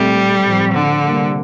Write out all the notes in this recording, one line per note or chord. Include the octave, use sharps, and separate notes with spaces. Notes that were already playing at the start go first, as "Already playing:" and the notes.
Already playing: A#2 G3 A3 C4
A2 F3 C4
D3
C3 G3 A#3